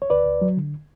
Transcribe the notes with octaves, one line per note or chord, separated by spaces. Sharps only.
C#5
D2 B4 D5
D2
F#3
D3